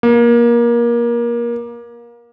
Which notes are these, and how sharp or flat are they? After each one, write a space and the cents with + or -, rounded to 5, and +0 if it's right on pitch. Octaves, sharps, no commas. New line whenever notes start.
A#3 +25